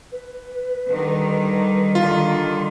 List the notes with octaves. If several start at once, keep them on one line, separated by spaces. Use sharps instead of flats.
B4
D3 D#3 G3
D3 D#3 G3 F4